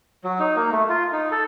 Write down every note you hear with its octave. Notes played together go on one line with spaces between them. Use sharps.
F#3
D#4
A#3
A3
F4
D#4
A4